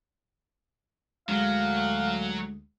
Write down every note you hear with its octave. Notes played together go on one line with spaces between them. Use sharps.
D2 F#3 G#3 F5